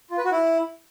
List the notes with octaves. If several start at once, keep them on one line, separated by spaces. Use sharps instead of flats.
F4
B4
F#4
E4